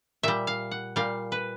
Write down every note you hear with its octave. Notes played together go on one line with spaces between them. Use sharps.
A#2 G3 E5
F5
F#5
A#2 G3 F5
B4